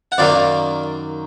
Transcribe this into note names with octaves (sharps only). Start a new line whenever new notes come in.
F#5
F#2 D#3 A#3 D5 F5